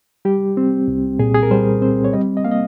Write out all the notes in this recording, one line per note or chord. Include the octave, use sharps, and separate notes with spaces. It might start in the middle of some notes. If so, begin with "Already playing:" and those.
G3 G4
C4
C2
A#2 G#4
G#4
A#4
G3 C5
C4 C5
C#5
G3 D#5
D#5
A#3 F5
D#5